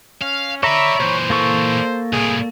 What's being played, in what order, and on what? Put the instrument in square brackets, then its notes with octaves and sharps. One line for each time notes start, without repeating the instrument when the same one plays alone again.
[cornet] C#4 [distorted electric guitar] F5
[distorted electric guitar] A4 D5 [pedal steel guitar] C#5 A#5 B5 [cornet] E5
[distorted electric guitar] A#2 E3 [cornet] C5
[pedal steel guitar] A#3 A4 C#6
[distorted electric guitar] C2 A2 [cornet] G#4